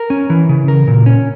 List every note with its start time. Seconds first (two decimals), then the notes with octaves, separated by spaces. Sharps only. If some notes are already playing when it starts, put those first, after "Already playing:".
Already playing: A#4
0.10 C#4
0.30 E3
0.49 C#3
0.68 A#4
0.87 A#2
1.06 C#4